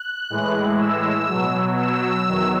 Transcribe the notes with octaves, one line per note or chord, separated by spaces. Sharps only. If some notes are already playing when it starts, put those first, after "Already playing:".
Already playing: F#6
A2 E3 G#3
E6
B2 F#3
E6
E2 D#3 F#3